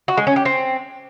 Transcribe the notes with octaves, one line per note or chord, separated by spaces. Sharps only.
F#4
G#3
C#4
G4
C4